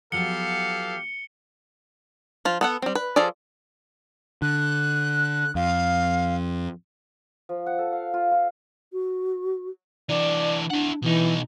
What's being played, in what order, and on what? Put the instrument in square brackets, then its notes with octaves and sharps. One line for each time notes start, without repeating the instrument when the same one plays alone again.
[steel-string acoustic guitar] F3 F#3 B3 [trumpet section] G4 A4 F5 [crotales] C#7 G7
[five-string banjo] F3 F4
B3 A4 F#5
G3 C4
B4
F3 F4 G#4 A4 D5
[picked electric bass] D3 [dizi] F#6
[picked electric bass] F2 [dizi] F5
[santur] F3
F#5
A4
F5
F4
F4
[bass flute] F#4
[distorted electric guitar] E3 D4 [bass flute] D5
[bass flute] D4 [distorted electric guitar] E4 F#5
[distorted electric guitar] B2 D#4 [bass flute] E3